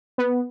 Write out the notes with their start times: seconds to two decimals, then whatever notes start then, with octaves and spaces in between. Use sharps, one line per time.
0.18 B3